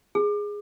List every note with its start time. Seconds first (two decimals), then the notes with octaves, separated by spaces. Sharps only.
0.15 G#4